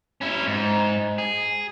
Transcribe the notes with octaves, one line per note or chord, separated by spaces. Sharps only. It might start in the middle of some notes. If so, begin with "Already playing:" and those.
C#4 E4
G#2
G#4